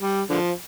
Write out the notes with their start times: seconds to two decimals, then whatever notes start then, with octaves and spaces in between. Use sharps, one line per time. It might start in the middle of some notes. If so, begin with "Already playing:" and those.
0.01 G3
0.30 D3 F3